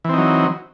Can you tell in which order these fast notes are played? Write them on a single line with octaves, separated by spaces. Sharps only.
E3 C4 D#4 F#3